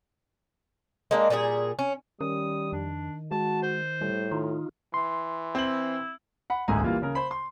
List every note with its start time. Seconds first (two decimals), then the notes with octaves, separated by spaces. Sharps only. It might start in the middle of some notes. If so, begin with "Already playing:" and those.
1.11 G#3 A#3 D4
1.30 A#2 G3 F#4 G#4
1.79 C#4
2.21 D#3 G3 C#4 D#6
2.73 F2 D4
3.31 G#3 F#4 A5
3.63 C5
4.01 A2 G3
4.32 D#3 D#4 F4
4.94 E3 C6
5.55 C4 E4 F#7
6.50 F#5 B5
6.68 D#1 G#1 D2 G#3 G#5 A#5
6.83 E3 G3 A#3 F4
7.02 C#3 A#4
7.15 C5 B5
7.31 C6